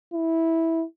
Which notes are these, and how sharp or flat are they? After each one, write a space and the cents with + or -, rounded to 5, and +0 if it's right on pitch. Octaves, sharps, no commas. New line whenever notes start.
E4 -10